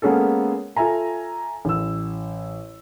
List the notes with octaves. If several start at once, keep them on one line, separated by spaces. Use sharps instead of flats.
G#3 A#3 B3 C#4 G#4 A4
F4 A4 E5 G#5 A#5
A1 E6